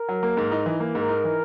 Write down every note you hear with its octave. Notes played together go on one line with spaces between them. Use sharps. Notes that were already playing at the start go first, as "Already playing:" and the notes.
Already playing: A#4
F#3
A#3
G#2
D#4
E3
A#3
G#2 A#4
D#4
E3